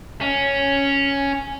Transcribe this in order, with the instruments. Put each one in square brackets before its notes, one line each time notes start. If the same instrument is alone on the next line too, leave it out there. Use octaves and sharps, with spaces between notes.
[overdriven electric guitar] C#4